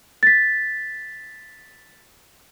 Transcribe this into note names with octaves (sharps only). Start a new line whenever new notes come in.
A6 B6